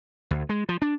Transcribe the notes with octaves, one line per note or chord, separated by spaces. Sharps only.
D2
G#3
F3
D4